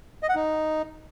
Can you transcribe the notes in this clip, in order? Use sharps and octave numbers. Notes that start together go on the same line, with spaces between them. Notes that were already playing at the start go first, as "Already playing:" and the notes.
D#5
F#5
D#4